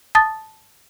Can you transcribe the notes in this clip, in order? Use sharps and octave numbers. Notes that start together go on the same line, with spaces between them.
A5 D#6 A6